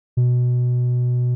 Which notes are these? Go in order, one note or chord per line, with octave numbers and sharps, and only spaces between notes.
B2